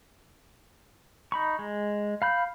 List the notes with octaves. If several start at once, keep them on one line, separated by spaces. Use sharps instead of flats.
D#4 B5 C#6
G#3
F5 B5 G6